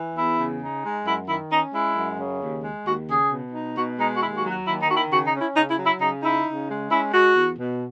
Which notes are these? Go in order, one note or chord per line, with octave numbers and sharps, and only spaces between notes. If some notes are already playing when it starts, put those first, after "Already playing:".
Already playing: E3
E2 E4
C#3
D#4
G#3
F#2 E4
D#3 E4
C#4 D#4
G#3 E4
F#2
C#3
D#2
G#3
D#2 F#4
C#3 G#4
B2
D#4
B2 F#4
G#3 D#4
F#4
D#2 E4
F#4
F#3
F#4
D#2 E4
D#4
D#3 F#4
E4
C#3 F#4
D#4
C#4
E4
C#3 D#4
E4
F#3
E4
C#3 D#4
D#4 E4
C#3
G#3
C#4 E4
G#3 F#4
E2
B2